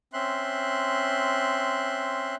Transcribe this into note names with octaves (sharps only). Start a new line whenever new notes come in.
C4 C#4 E5 C6 F#6